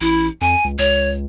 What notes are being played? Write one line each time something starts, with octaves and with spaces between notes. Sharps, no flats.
A1 E4
F2 G#5
C#2
C#2 C#5